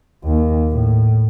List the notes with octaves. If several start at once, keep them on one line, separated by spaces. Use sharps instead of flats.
D#2
A2